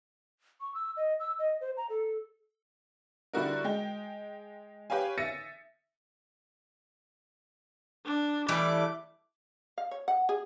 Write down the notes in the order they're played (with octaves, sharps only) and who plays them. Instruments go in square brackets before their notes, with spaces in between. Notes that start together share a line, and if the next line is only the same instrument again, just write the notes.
[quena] C#6
E6
D#5
E6
D#5
C5
A#5
A4
[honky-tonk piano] D3 G3 E4 F#4 A#4
G#3 G5
G4 B4 C#5 F5 G#5
E5 A6 A#6 C#7 D#7
[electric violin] D4
[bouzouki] E3 G3 A3 [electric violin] D6
[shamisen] F5
C#5
F#5
G#4